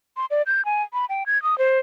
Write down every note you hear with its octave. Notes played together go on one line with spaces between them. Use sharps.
C6
D5
G6
G#5
B5
G5
G#6
D#6
C5